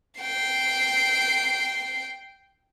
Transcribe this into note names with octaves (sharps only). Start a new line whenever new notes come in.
G5 C7